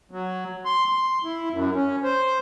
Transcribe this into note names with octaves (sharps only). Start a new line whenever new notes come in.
F#3
C6
C6
E4
F#2
C#4
C5